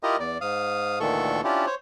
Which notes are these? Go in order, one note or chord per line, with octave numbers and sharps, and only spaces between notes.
E4 F4 G4 A#4 D#5
E2 D5
G#2 F5 D#6
D2 A#2 D#3 E3 A4 C#6
C#4 D4 E4 F4 G4
C5 C#5